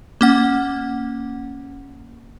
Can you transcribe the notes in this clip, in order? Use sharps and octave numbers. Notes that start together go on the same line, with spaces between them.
A#3 C#4 F#5